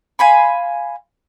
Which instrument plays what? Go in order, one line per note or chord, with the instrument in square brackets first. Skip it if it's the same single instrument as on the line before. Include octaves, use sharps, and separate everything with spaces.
[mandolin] F5 G#5 B5 C6